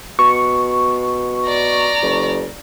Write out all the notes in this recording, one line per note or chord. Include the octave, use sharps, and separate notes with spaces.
B2 C#6
D5 A#5
F#1